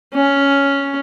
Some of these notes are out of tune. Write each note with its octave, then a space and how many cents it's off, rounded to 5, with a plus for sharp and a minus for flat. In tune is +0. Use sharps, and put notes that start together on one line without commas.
C#4 +5